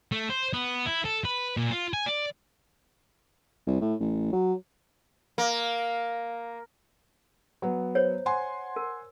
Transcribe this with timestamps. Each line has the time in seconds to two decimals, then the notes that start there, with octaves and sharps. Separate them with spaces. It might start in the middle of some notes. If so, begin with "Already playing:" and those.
0.12 A3
0.29 C5
0.53 B3
0.86 E4
1.05 A4
1.25 B4
1.57 A#2
1.71 F4
1.93 G#5
2.06 D5
3.67 C2
3.81 A2
4.00 A1
4.33 F#3
5.38 A#3
7.62 F#3 B3
7.95 C5 C#5
8.26 F#5 G#5 C6
8.76 A#4